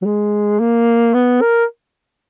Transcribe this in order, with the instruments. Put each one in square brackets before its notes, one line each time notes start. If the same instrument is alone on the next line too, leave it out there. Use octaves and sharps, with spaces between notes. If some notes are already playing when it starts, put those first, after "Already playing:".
[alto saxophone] F#3
G#3
A#3
B3
A#4